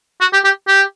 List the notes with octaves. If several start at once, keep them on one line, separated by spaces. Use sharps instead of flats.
F#4
G4
G4
G4